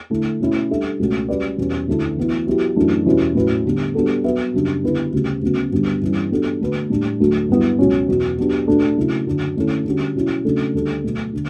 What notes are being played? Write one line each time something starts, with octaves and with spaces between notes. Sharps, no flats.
D3 A3 E4
B2 A3 C#4 E4
G3 D4 A4 E5
C#2 B2 A3 C#4 F#4
G3 C#4 F#4 B4 D5
E2 B2 G3 C#4
D2 D3 A3 E4 A4
E3 B3 E4
F#3 B3 E4 G4
F#2 E3 A3 D4
E2 B2 G3 C#4 E4
A2 F#3 C#4 E4 B4
D3 G3 B3
G3 B3 D4 F#4 A4
F#3 B3 F#4 B4 E5
F#2 C#3 G3 D4
D3 G3 B3 E4 B4
D2 C#3 G3
D2 C#3 F#3 B3
G2 D3 G3 B3 D4
G2 E3 G3 C#4
G3 B3 D4 F#4 A4
D3 A3 D4 F#4 B4
A2 G3 D4
D2 D3 F#3 A3
G2 F#3 B3 E4
C#2 B2 F#3 C#4
E2 B2 F#3
F#3 B3 D4 G4
B2 A3 D4 A4
C#3 F#3 A3 E4
F#2 D3 F#3
D3 A3 C#4 E4 A4
D3 G3 C#4 F#4
B2 F#3 C#4 E4
C#3 F#3 A3 D4 A4
D2 D3 G3 D4 A4
B2 F#3 A3
D3